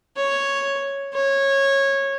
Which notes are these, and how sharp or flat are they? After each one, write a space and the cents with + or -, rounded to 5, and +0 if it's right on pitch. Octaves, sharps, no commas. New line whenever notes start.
C#5 +0
C#5 -15